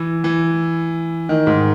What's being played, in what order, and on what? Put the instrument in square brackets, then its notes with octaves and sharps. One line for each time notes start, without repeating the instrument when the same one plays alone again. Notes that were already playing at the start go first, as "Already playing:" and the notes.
Already playing: [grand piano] E3
E3
D#3
G#2